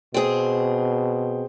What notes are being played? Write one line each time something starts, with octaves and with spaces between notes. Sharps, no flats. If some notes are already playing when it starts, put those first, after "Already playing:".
B2 C4 G#4